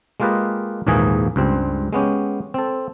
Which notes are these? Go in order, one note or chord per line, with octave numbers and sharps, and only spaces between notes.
G#3 A#3 F4 G4 B4 D#5
A#1 D#2 G#2 E3 A#3 G#4
C#2 G2 C4
G#3 B3 C#4 G4
C4 A4